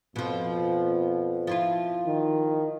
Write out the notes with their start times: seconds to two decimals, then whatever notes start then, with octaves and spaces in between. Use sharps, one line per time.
0.16 F2 B2 F3
1.47 F3 E4 F4
2.07 D#3